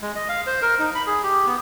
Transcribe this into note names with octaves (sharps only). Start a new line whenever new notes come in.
G#3
D#5
F5
C5
A#4
D#4
B5
G#4
G4
B3